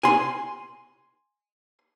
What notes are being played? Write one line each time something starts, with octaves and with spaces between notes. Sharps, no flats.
G#5 C6